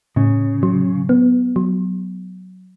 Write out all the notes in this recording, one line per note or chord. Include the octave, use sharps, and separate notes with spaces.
A2 C#3
F#3
B3
F#3